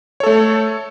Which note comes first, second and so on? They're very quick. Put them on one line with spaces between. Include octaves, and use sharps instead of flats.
C#5 A4 A3